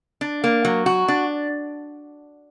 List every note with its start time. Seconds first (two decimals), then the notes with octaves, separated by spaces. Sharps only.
0.21 D4
0.44 A#3
0.65 F#3
0.86 F#4
1.08 D4